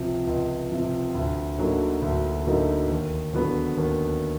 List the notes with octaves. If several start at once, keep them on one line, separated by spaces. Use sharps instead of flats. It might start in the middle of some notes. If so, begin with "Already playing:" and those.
Already playing: C#2 C3 F3
C#2
C3 F3
D2
D3 F#3 A#3 D#4
D2
D3 F#3 A#3 D#4
D#2
D3 F#3 B3
D#2